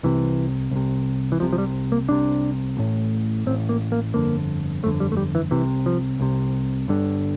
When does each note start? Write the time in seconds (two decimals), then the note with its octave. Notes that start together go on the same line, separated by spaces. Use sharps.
0.03 C2 C3 E3
0.71 C2 C3
1.32 E3
1.40 C2 C3 F3
1.53 F3
1.58 G3
1.92 A#3
2.09 C2 C3 D4
2.77 A1 A2
3.46 A1 A2 C4
3.69 A#3
3.92 A#3
4.14 G1 F2 D3 A#3
4.83 G1 F2 D3 A3
5.00 G3
5.12 A3
5.17 G3
5.35 E3
5.51 C2 C3 E3
5.86 F3
6.20 C2 C3
6.88 G1 G2 D3